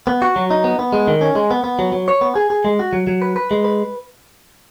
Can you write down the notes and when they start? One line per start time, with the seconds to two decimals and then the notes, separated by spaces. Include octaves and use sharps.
0.07 B3
0.22 F#4
0.36 F#3
0.51 D#4
0.64 B3
0.79 B3
0.93 G#3
1.07 D#3
1.21 C#4
1.35 G#3
1.51 B3
1.64 B3
1.79 F#3
1.92 F#3
2.08 C#5
2.21 B3
2.36 G#4
2.50 G#4
2.65 G#3
2.79 F#4
2.93 F#3
3.07 F#3
3.22 B4
3.36 B4
3.51 G#3
3.64 B4